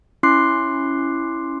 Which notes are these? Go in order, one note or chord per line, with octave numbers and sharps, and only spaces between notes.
C#4 E4 C6 D6 F#6 C7